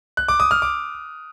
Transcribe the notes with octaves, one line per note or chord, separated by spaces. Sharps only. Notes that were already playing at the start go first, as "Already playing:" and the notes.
F#6
D6
D#6
F6
D6